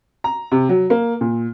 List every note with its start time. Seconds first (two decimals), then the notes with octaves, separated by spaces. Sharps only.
0.24 A#5
0.52 C3
0.69 F#3
0.90 A#3
1.21 A#2